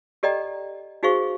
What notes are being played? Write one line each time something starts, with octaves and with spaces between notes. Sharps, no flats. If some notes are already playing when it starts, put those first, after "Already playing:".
G4 A4 D5 D#5 G5 A#5
D#4 F#4 G#4 C5 F5 C#6